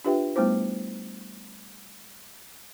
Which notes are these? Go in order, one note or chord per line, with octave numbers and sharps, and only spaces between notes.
D4 F4 G4 B4 E5 G5
G3 A3 B3 E4 C5